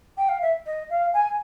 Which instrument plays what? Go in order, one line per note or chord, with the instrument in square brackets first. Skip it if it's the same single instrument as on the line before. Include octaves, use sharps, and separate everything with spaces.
[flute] G5
F5
E5
D#5
F5
G#5